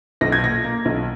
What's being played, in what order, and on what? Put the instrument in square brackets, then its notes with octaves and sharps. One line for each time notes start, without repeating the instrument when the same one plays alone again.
[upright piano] B1 A#6
G#6
A#2 A#6
A#3
B1